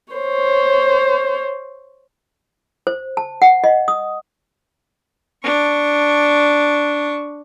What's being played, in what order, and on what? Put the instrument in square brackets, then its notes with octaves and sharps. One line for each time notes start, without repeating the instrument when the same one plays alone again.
[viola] C5 C#5
[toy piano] C5
A5
F#5
D#5
D#6
[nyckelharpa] D4 C#6